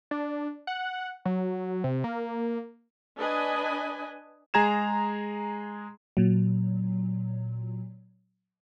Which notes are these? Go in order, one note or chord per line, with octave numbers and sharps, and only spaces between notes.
D4
F#5
F#3
C3
A#3
D4 B4 D#5 G#5
G#3 G#4 A#5 G#6 E7
A#2 F#3